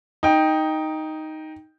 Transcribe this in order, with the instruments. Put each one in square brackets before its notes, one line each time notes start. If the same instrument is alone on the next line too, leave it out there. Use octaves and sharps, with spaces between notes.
[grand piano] D#4 G5